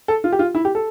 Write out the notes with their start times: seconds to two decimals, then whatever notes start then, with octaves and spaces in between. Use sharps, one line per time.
0.08 A4
0.24 F4
0.32 G4
0.39 F4
0.55 E4
0.65 G4
0.75 A4